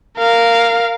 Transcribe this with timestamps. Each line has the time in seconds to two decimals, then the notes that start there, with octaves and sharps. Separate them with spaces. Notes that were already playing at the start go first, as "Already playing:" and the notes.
0.18 A#4 F5